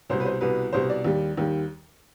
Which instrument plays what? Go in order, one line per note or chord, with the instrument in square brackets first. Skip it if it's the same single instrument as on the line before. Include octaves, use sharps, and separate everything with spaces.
[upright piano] C2 B2 G3 C5
B4
C5
C2 B2 G3 B4
C2 B2 G3 C5
D5
D#2 D#3 G3
D#2 D#3 G3